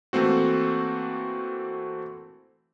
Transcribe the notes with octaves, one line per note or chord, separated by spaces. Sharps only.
E3 A3 A#3 C4 F#4